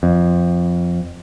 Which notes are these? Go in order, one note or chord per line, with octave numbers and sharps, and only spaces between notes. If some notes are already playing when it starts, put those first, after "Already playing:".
F2